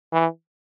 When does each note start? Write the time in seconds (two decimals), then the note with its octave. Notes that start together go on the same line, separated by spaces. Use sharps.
0.13 E3